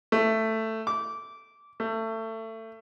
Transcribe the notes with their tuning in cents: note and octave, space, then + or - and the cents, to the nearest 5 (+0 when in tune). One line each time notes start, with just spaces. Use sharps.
A3 +10
D6 -15
A3 +25